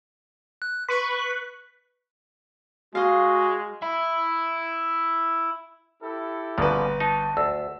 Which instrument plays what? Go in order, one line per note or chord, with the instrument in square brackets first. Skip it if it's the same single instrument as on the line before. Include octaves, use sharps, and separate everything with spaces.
[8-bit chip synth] F#6
[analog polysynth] B4 B5 C#6 [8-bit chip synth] B6
[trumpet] G#3 [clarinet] F#4 [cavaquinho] D#5 F5
[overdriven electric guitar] E4 E5
[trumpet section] E4 G4 A4
[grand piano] G1 B4 [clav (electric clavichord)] A#2 C#3 F3
[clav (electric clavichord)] D#4 [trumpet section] A5
[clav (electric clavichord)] D2 [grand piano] E6